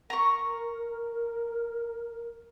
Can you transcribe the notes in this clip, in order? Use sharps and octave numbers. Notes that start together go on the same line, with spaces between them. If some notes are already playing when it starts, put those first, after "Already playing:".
A#4 A#5 C#6